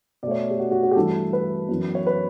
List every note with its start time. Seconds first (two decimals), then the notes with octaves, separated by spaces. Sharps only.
0.23 B2 D5
0.27 A3 C#5
0.51 G4
0.59 F#4
0.71 F#4
0.83 F#4
0.91 G4
0.96 G2 E3 A3 A4
1.33 B4
1.69 F#2 E3 B3
1.95 C#5
2.07 B4